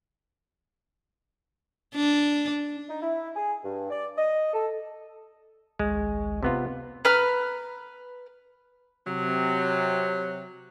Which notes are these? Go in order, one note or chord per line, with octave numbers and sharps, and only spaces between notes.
D4
D#4
E4
G#4
G2
D5
D#5
A4
G#1 C#2 G#3
C3 B3 F4
B4 A#5 F6
C3 F#3